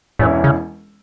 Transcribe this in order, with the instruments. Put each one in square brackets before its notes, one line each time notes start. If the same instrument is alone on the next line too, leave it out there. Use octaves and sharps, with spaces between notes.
[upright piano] E1 E2 E3 C#4 E4 [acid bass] A2
[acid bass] C#3